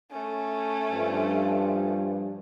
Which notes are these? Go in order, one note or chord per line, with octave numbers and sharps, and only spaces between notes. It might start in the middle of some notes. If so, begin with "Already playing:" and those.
A3 C#4
G2 F3